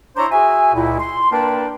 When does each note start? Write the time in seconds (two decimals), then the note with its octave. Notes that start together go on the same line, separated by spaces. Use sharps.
0.16 D4 E4 C5 C#5 A#5
0.31 F#4 G#4 E5 G#5
0.74 C#2 A#2 E4
0.99 C6
1.31 A#3 D4 A#4 B4 G5 A5